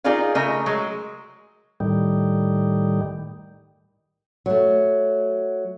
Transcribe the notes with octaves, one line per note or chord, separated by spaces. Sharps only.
D#4 F4 G#4 A#4 D5 F5
C#3 A3 A#4 D#5
F#3 G#3
A2 D#3 G3
F#3 A3